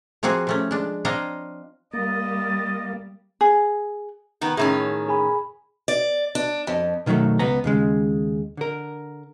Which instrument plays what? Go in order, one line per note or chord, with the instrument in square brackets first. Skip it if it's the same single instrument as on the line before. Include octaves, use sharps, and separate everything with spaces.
[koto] F3 A#3 C4 F#4 G#4
C3 A3 C#4
G#3 D4
C4 D4 C#5 D#5 F5 A#5
[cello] G3 [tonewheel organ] A#3 [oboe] D#5 [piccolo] A6
[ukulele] G#4
[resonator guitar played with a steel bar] D#3 B3
[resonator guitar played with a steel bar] A2 D#3 C#4 [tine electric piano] G#4
[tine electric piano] G#4 G#5 B5
[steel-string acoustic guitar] D5
D4
F2
[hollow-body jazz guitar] B2 D#3 E3 F#3 A3
C#2 B3 A#5
D#2 C#3 G#3
D3 A#4